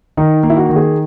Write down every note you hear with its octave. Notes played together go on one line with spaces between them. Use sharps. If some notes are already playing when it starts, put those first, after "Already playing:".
D#3 D#4
A#3
E4
F#4
D#3
G#4